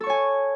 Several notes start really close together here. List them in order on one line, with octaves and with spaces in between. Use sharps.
A4 C#6 C#5 G#5